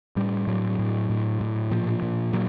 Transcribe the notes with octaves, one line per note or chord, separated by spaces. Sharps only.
A2 G3
A2 F#3
A2
A2
A2
A#2 F3
A#2
A#2 F#3